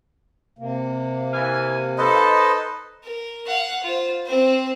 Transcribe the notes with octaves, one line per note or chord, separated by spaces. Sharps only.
C3 A#3
E3 F5 G#5
D#4 A4 B4 C5 D#5
A#4
F5 F#5
F4 C5
C4 C5